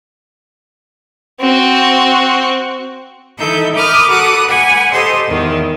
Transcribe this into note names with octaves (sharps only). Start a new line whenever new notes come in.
C4 F#4
E3 D#4 A4 E5 G6
A#4 B5 D6 D#6 F6 G6
F#4 A4 B4 D6 D#6 F#6
B4 F#5 G#5
G4 A4 C5 D#5 C6
E2 D#3